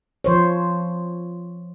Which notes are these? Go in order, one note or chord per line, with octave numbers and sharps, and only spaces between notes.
F3 C5 C#5